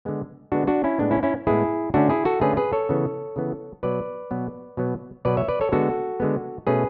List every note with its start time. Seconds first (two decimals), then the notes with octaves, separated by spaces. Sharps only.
0.05 D3 G#3 B3
0.52 D3 G#3 B3 D4 F#4
0.67 D4 F#4
0.84 C#4 E4
0.99 A2 G#3 B3 D4
1.11 C#4 E4
1.23 C#4 E4
1.47 A2 G#3 B3 E4 G#4
1.94 D3 A3 C#4 D4 F#4
2.09 E4 G#4
2.25 F#4 A4
2.41 D3 A3 C#4 G#4 B4
2.57 G#4 B4
2.73 A4 C#5
2.89 C#3 E3 B3
3.36 C#3 E3 B3
3.83 B2 F#3 B3 B4 D5
4.31 B2 F#3 B3
4.77 B2 F#3 B3
5.25 B2 F#3 B3 B4 D5
5.37 C#5 E5
5.49 B4 D5
5.61 A4 C#5
5.72 D3 G#3 B3 F#4 A4
6.20 D3 G#3 B3
6.67 B2 A3 C#4 G#4 B4